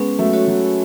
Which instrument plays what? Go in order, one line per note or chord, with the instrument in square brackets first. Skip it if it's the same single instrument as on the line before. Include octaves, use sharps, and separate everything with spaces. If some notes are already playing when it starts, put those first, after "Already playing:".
Already playing: [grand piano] G#3 B3 [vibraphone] C#4
[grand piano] F#3 A3
[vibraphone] F#4 A4 C#5
[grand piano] F#3